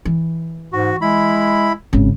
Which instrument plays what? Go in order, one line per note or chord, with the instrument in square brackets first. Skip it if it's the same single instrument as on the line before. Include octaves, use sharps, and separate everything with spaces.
[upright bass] E3
[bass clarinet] G#2 [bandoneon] F#4
[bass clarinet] G#3 [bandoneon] E4 B5
[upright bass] G#1 C#3